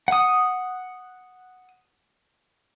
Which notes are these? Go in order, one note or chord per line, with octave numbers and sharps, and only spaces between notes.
F#5 D#6